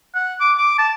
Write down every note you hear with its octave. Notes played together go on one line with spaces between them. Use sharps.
F#5
D6
D6
A5